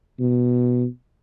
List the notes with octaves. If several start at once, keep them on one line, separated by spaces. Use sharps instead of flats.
B2